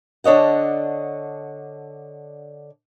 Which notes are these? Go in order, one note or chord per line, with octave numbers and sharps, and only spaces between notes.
D3 D4 C#5 D#5 F#5